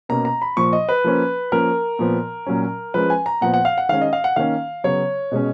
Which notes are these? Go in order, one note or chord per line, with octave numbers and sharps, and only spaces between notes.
B2 A#3 C#4 A#5
A#5
B5
A#2 F3 A#3 C#6
D#5
B4
F3 A#3 C#4
F3 A#3 C#4 A#4
A#2 F3 B3
A#2 F#3 C#4
F3 G#3 C#4 B4
G#5
A#5
A#2 F3 B3 F#5
F#5
F5
F#5
D#3 G#3 C#4 F5
D#5
F5
F#5
D#3 A#3 C#4 F5
C#3 F#3 B3 C#5
B2 G#3 C#4